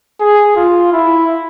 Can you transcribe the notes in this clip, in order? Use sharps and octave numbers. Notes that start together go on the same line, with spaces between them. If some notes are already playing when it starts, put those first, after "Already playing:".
G#4
F4
E4